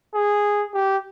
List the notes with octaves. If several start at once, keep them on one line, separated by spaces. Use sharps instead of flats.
G#4
G4